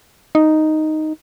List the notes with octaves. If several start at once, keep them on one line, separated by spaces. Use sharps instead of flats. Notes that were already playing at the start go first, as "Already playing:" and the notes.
D#4